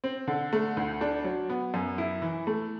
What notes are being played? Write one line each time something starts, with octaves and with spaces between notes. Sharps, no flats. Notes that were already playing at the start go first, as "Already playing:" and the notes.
C4
D3
A3
D2
D4
F#3
B3
F#2
E4
E3
A3